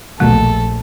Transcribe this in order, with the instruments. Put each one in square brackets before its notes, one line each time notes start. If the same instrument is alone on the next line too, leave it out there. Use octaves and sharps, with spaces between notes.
[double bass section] A#1 [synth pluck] D#2 B2 F#3 [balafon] A3 [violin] A4